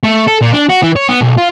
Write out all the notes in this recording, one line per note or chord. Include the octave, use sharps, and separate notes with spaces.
A3
A4
A#2
D4
F#4
E3
C#5
B3
B1
F4